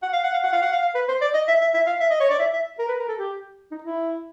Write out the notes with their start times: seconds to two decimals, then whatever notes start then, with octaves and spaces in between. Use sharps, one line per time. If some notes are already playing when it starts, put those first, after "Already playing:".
0.03 F#5
0.13 F5
0.24 F#5
0.33 F5
0.43 F#5
0.53 F5
0.62 F#5
0.72 F5
0.82 F5
0.95 B4
1.08 C5
1.21 D5
1.34 D#5
1.48 E5
1.61 E5
1.74 E5
1.87 F5
2.00 E5
2.11 D#5
2.20 C#5
2.30 D5
2.39 E5
2.53 E5
2.79 A#4
2.88 B4
2.99 A#4
3.09 A4
3.19 G4
3.71 D#4
3.83 E4